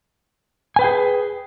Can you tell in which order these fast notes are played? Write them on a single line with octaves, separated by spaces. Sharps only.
G#5 B4 G5 G#4